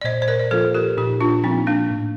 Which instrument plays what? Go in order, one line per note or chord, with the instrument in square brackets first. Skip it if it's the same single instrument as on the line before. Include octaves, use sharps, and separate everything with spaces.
[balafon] D5
[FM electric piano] A#2 [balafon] C5 D#5
[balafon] C5
A#4 D5
D5
[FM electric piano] F3 A#3 F4 [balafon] A4 C5
[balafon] G4 A#4
[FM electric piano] A#2 [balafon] D#4 G4
[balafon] D4 F4
[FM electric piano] F3 A#3 F4 [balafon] C4 D#4
[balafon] A#3 D4
[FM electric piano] A2